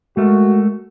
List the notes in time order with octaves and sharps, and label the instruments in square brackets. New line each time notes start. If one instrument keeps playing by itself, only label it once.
[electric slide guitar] G#3 A3 A#4 [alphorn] F#4